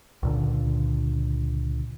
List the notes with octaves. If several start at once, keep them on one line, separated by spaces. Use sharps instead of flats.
C#2 A#2 D3